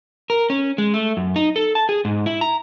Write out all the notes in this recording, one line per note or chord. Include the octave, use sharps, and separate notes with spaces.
A#4
C#4
G#3
A3
F#2
D#4
A4
A5
G#4
G#2
E4
A#5